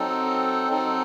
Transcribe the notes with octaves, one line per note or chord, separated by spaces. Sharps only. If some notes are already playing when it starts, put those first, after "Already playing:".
Already playing: F#3 C4 D#4 A4
F#3 C4 D#4 A4